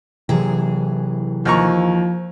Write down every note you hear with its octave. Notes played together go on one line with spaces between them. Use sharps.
C3 E3 F#3 G#4
D#2 F3 A#5 C#6